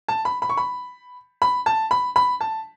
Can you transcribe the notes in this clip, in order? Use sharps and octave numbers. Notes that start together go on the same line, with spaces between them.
A5
B5
B5
C#6
B5
B5
A5
B5
B5
A5